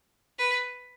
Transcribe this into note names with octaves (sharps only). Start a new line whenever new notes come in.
B4